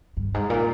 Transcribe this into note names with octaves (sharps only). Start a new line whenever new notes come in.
G2
G#2
A#2